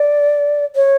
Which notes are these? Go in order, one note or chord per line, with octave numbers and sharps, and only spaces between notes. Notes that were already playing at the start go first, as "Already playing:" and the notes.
Already playing: D5
C#5